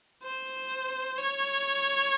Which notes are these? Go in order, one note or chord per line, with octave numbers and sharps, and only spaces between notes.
C5
C#5